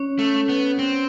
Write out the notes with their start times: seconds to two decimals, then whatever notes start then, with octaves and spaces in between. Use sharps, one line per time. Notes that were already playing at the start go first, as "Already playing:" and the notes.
Already playing: C#4 C#5
0.19 A3
0.49 B3
0.79 C4